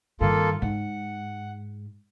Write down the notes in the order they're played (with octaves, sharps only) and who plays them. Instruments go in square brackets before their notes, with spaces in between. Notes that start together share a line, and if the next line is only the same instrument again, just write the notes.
[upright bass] G2 D#3 [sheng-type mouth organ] A#3 F4 A4
[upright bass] G#2 [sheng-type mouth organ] F#5